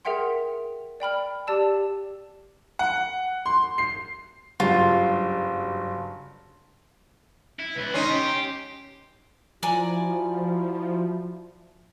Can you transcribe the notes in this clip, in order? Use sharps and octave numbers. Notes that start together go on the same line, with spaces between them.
G#4 A#4 E5 F#5 G5 C6
D5 G5 B5 F6
G4 D5 A5 E6
F#5
C6
C7
F#1 G2 F#3 F4
E4
C#2 B3 B4
C#4 D#4 C6
G4
F3 E4 F#4 D5 G#5 A#5